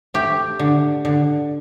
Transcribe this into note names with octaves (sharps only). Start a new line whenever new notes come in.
A3 G4
D3
D3